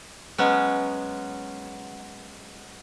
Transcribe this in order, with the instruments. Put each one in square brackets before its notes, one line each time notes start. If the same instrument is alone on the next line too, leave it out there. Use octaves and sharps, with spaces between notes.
[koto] F#3 G#3 B3 C#4